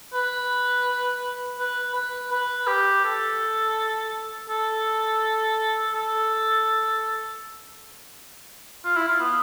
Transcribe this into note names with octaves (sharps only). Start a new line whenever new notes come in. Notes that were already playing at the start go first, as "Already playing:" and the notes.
B4
B4
B4
B4
G4
A4
A4
A4
F4
E4
F4
B3